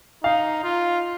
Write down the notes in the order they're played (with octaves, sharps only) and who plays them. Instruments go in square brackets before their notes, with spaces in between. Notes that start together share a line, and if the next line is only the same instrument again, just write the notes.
[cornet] D#4 [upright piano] F5
[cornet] F4